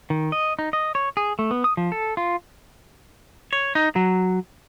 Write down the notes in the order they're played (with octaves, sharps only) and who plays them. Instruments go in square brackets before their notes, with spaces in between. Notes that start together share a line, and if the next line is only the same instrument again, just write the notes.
[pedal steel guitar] D#3
D#5
D#4
D#5
C#5
G#4
A3
B3
D#6
F3
A4
F4
[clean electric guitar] C#5
D#4
F#3